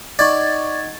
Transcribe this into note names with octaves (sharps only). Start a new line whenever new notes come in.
D#4 D5 D#5 F#5 C#6 G#6 A6